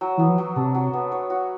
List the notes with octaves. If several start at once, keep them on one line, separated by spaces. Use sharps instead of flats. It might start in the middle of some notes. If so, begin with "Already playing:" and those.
F#3
E3 B3
F3
F#3
C3 D4
F#3
B3
C#5
F#4